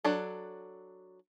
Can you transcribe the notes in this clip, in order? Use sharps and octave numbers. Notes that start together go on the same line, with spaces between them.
F#3 D4 A4